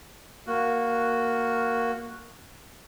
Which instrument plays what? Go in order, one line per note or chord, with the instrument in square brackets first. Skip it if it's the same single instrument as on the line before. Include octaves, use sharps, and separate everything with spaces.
[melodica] A#3 F#4